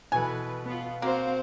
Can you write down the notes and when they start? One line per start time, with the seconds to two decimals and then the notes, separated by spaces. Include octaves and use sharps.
0.12 B2 E3 A4 B4 G#5
0.66 B3 F4
1.02 A#3 C4 F#4 C5 F5